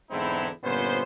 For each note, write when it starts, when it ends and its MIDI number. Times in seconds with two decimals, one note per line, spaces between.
0.10 0.48 40
0.10 0.48 44
0.10 0.48 50
0.10 0.48 60
0.10 0.48 63
0.10 0.48 64
0.64 1.02 31
0.64 1.02 46
0.64 1.02 59
0.64 1.02 61
0.64 1.02 72